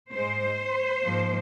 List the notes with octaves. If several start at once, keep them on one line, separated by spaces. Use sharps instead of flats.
G#3 C5
G#2
G#2 F3 A#3